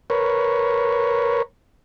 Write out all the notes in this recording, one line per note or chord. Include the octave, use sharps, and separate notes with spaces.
A#4 B4 C#5